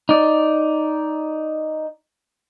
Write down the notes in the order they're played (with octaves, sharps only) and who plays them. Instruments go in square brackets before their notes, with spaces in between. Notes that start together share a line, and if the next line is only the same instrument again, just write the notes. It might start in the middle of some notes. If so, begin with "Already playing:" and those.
[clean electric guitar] D#4 D5